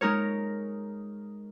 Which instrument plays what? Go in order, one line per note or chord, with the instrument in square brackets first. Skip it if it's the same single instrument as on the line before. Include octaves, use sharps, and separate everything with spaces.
[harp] G#3 D#4 A#4 C#5